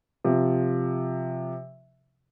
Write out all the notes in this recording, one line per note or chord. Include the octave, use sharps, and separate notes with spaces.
C3 F3